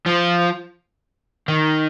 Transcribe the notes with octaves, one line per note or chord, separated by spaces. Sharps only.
F3
D#3